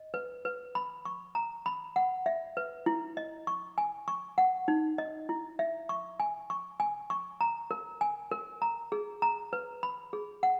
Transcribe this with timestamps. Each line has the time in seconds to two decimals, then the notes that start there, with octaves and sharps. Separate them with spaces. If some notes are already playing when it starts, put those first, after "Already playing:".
Already playing: D#5
0.14 B4
0.45 B4
0.75 B5
1.05 C#6
1.35 A#5
1.66 B5
1.96 F#5
2.26 E5
2.57 B4
2.86 E4
3.17 D#5
3.47 C#6
3.78 G#5
4.08 C#6
4.38 F#5
4.68 D#4
4.98 D#5
5.29 E4
5.59 E5
5.89 C#6
6.20 G#5
6.50 C#6
6.80 G#5
7.10 C#6
7.41 A#5
7.71 A#4
8.01 G#5
8.31 A#4
8.62 A#5
8.92 G#4
9.22 A#5
9.53 B4
9.83 B5
10.13 G#4
10.43 F#5